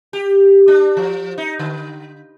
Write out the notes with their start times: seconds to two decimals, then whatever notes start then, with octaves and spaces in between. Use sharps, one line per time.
0.13 G4
0.68 D4
0.97 F3
1.38 D#4
1.59 D3